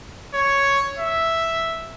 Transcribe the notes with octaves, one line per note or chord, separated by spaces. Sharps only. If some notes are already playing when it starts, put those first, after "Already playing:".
C#5
E5